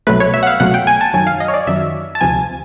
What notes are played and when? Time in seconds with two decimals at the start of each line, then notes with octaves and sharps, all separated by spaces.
0.07 C2 B2 F#3 A3 B4
0.20 C#5
0.34 E5
0.43 F#5
0.47 F5
0.60 C2 B2 F#3 A3 F#5
0.74 G5
0.87 G#5
1.01 A5
1.14 F#2 D#3 F#3 G#5
1.27 F5
1.40 D#5
1.48 C#5
1.54 D5
1.67 F#2 D#3 F#3 E5
2.15 A5
2.21 D2 C3 F3 G#5